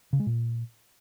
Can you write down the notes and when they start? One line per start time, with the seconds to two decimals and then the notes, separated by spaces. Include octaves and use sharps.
0.13 C#3
0.20 G#3
0.27 A#2